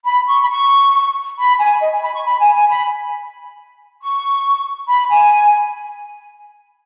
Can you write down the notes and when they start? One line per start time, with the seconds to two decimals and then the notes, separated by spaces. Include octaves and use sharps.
0.06 B5
0.27 C#6
0.43 B5
0.49 C#6
1.38 B5
1.60 G#5
1.82 D#5
1.92 G#5
2.03 B5
2.14 C#6
2.26 B5
2.40 G#5
2.54 G#5
2.69 B5
4.01 C#6
4.88 B5
5.11 G#5